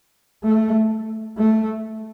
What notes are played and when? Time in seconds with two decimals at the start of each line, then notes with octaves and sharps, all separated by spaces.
0.44 A3
1.38 A3